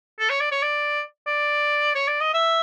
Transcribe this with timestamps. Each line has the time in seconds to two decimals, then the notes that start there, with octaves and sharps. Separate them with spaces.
0.19 A4
0.30 C#5
0.40 D5
0.51 C#5
0.62 D5
1.27 D5
1.95 C#5
2.08 D5
2.21 D#5
2.34 E5